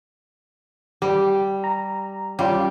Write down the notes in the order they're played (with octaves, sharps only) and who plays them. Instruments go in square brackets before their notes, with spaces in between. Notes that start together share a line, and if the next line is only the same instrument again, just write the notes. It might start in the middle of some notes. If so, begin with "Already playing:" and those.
[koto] G3 [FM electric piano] G4
[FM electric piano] A#5
[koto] G3 [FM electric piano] C#4 F4